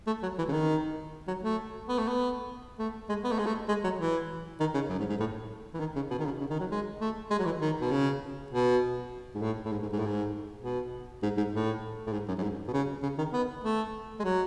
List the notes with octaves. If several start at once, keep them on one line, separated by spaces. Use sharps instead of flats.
A3
F#3
E3
C#3
D#3
F#3
A3
B3
A3
B3
A3
G#3
B3
A3
G#3
A3
G#3
F#3
E3
D#3
C#3
F#2
G#2
G#2
A2
E3
D#3
C#3
B2
D#3
C#3
C#3
D#3
F#3
G#3
A3
G#3
F#3
E3
D#3
B2
C#3
B2
G#2
A2
A2
G#2
G#2
G#2
A2
G#2
B2
G#2
G#2
A2
A2
G#2
F#2
F#2
G#2
B2
C#3
C#3
D#3
B3
A3
G#3
F#3